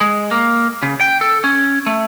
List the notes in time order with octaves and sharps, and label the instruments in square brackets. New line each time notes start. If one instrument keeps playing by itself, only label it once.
[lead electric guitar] G#3
A#3
C#3
G5
A4
C#4
A3